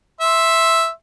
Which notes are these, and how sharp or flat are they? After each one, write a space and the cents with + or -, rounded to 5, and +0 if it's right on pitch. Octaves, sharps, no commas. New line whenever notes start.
E5 +0 C6 +10